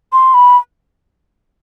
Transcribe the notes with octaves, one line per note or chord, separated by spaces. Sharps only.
C6
B5